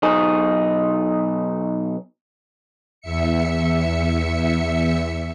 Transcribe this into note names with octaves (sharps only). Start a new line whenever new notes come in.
B1 D#4 G#4
E2 E5 C#7